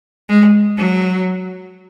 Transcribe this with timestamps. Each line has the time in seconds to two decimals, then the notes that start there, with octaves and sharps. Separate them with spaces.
0.29 G#3
0.77 F#3